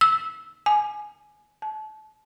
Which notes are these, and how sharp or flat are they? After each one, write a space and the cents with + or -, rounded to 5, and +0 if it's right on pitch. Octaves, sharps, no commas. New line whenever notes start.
E6 -15
G#5 +15
A5 -35